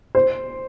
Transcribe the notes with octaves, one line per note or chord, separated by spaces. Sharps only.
C5